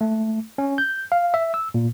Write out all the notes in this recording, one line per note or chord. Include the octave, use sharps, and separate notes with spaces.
A3
C#4
G6
F5
E5
E6
A#2